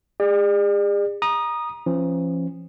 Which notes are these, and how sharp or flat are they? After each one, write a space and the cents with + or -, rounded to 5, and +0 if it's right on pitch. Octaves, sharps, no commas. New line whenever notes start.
G#4 -40 D5 +35
A#5 +25 D#6 -15
F3 -35 C#4 -30